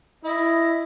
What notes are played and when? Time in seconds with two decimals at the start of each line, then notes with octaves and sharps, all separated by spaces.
0.24 E4 D#5